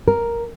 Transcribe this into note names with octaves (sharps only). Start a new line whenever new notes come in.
A#4